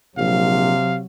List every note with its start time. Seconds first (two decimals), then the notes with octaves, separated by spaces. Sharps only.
0.18 A#1 C3 F#3 F5